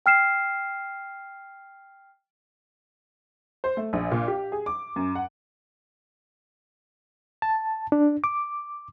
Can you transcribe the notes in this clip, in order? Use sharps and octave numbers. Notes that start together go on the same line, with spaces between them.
G5 F6 C7 E7
C5
A3
A#1
A#2
G4
G#4
D6
F#2
F#5
A5
D4
D6